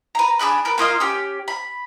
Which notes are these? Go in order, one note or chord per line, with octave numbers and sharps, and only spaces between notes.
B4 A#5
D4 G#4 B5 F#6
A#4 B4
A#3 F4 D#5 F5
C#4 G4
B5